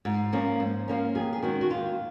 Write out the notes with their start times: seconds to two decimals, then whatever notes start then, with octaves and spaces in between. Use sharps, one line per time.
0.05 G#2
0.33 F3 A#3 C#4
0.60 G#2
0.88 F3 A#3 C#4
1.15 D#2 G#4
1.33 G#4
1.43 D#3 G#3 C#4 F#4
1.61 F#4
1.70 D#2 F4